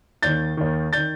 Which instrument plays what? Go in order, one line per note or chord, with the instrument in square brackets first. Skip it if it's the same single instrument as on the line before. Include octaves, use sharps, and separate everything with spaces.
[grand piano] D#2 D#3 G6 A6
D#2 D#3
D#3 G6 A6